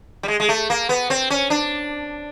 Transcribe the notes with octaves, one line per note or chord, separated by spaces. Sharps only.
G3
G#3
G#3
A3
A#3
B3
C4
C#4
D4